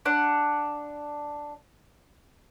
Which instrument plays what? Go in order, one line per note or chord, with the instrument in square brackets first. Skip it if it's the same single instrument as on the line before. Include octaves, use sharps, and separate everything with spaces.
[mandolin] D4 F#5